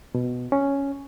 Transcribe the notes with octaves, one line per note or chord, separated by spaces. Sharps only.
B2
C#4